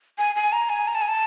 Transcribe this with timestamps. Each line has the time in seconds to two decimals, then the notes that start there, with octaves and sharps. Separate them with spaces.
0.18 G#5
0.36 G#5
0.52 A#5
0.70 G#5
0.88 A#5
0.95 A5
1.02 G#5
1.09 A5